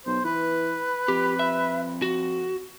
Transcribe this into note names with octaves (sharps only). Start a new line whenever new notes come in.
B1 C5
E3 B4
F2 G4
E5
F#4